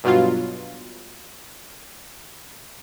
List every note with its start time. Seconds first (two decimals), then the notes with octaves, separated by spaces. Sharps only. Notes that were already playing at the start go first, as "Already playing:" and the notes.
0.04 G2 B2 F#3 F4